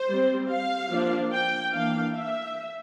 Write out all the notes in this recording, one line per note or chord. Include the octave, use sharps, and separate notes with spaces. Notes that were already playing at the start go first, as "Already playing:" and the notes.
Already playing: C5
G3 C4
F5
F3 A#3 D4
G5
E3 A#3 D4 F5
E5